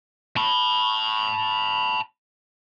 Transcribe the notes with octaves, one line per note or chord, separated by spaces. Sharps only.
A5 B5